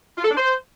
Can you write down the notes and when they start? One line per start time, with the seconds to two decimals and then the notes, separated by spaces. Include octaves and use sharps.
0.18 F4
0.24 A4
0.30 D4
0.37 C5